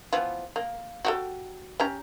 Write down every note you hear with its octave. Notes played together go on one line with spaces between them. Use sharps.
E3 F3 B3
A#3
F#4 G4 A4
C#4 G4 A#5